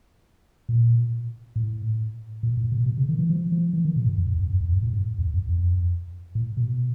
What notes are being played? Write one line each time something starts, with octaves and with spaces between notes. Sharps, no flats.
A#2
A2
A#2
A2
B2
B2
C#3
D#3
E3
F3
F3
E3
D#3
B2
G#2
F2
E2
F2
F#2
E2
F#2
A2
G#2
E2
F2
F2
A2
B2